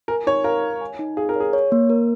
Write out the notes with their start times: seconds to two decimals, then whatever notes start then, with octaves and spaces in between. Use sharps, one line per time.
0.08 A#4 G#5
0.27 D#4 C#5
0.44 A#4 F5
0.63 C#5
0.81 G#5
0.99 D#4
1.17 G#4 F5
1.29 A#4
1.36 G#4 C#5
1.53 C#5
1.72 A#3
1.90 A#4